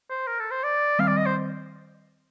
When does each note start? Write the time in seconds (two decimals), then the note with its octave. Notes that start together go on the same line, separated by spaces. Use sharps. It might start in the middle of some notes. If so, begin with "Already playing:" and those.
0.10 C5
0.27 A#4
0.39 A4
0.51 C5
0.64 D5
0.99 D#3 G3 C4 F5
1.08 D5
1.18 D#5
1.26 C5